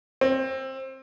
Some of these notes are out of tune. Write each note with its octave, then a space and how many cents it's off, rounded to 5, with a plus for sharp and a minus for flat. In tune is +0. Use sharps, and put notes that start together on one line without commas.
C4 +20